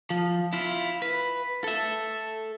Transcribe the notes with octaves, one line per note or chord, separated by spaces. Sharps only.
F3
E4 F4
B4
A4 E5